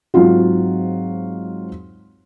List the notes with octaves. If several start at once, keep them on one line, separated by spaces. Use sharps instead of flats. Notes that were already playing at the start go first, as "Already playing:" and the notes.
G#2 F#3 C4 F4 F#4